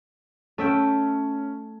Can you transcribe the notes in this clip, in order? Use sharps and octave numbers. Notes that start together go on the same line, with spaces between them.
A3 C#4 E5 G5